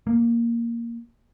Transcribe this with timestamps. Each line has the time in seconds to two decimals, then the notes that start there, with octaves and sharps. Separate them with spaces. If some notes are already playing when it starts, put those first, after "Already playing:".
0.07 A#3